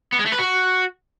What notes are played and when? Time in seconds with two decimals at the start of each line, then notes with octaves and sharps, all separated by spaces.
0.13 B3
0.19 G#3
0.26 A3
0.32 B4
0.39 F#4